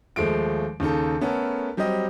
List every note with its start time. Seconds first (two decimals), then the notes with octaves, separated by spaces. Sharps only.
0.16 D#2 F3 G#3 A3 D7
0.80 D#2 C#3 D#4 A4
1.21 A3 B3 C#4 A4 A#4
1.77 F#3 G3 C4 G4 D#5